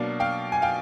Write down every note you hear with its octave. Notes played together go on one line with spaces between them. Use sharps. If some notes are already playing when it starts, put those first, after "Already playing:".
Already playing: B2 F#3 A#3 D4 F5
F5 G5
G#5
F5 G5